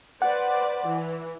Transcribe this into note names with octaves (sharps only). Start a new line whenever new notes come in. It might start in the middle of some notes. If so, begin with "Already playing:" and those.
B4 C5 D5 F#5
E3